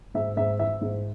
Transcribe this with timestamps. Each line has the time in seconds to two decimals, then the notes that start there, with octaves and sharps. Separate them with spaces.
0.14 G#2 E5
0.37 G#2 E5
0.59 E3 E5
0.81 G#2